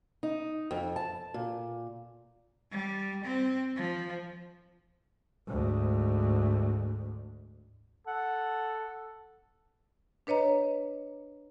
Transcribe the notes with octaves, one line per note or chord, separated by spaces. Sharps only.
D#4
F2
A5
A#2
G3
C4
F3
D2 G#2
A4 F#5
D4 B4 C#5 D#5 A#5